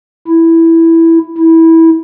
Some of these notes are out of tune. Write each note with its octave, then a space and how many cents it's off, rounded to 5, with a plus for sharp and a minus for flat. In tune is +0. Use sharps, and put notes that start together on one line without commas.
E4 +0
E4 -15